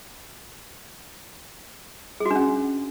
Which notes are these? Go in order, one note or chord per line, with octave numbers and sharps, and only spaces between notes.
G#4
F#4
D4
C#4